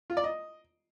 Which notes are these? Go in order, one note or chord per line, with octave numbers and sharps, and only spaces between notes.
F4
D5
D#5